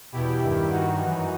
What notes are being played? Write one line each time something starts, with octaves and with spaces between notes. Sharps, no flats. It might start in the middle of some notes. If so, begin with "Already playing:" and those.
E2 B2 E4 G4
G2 D#3
G2 D#3 D#4 F#4
F#2 E3